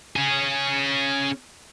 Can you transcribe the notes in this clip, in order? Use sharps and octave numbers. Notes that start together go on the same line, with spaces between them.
C#4 G#4